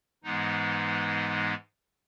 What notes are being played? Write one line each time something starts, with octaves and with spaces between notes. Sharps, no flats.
G#2 E3 G#3 B3 D#4